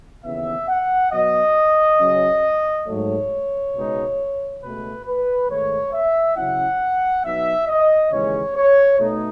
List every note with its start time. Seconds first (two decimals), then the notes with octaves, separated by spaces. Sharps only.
0.24 D#2 C#3 E3 B3 E5
0.68 F#5
1.12 B2 F#3 B3 D#5
1.99 C#3 F#3 C#4
2.87 G#2 F#3 A3 C#5
3.74 C#2 B2 G#3 D#4
4.62 C#2 B2 A3 B4
5.05 B4
5.49 G#2 D#3 A3 C#5
5.93 E5
6.36 C#3 F#3 C#4 E4 F#5
7.24 B2 F#3 B3 D#4 E5
7.68 D#5
8.11 D#2 C#3 E3 G#3 C#4 C#5
8.55 C#5
8.99 B2 A3 D#4